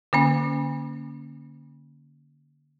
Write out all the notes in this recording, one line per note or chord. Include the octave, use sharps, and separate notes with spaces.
D3 A#3 C#4